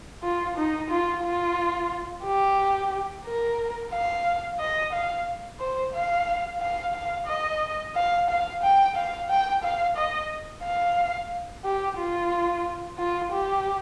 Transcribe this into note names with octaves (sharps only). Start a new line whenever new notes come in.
F4
D#4
F4
F4
G4
A#4
F5
D#5
F5
C5
F5
F5
F5
D#5
F5
F5
G5
F5
G5
F5
D#5
F5
G4
F4
F4
G4